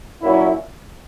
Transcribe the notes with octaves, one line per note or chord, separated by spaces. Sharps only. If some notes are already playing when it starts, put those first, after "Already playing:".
A#2 F#3 A#3 C#4 E4